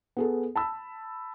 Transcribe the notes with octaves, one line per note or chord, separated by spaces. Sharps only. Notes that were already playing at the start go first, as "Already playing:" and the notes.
B3 G#4 A4
A5 B5 E6